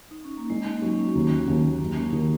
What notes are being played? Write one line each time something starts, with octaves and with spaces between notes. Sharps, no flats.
D#4
C#4
A#3
G#3 D#4
A#3
F#3 C#4
C#4
D#2 A#3
D#2 G#3
F#2 A#3
C#4
D#3 D#4